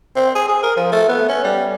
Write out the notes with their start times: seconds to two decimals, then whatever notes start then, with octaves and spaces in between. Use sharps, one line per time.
0.16 C4
0.35 G#4
0.48 G#4
0.63 A#4
0.77 F3
0.92 A3
1.09 B3
1.29 C#4
1.44 G3